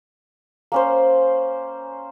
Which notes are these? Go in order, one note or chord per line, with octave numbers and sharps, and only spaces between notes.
A#3 C#4 C5